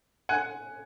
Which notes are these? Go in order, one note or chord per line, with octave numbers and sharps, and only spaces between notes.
F#5 G#5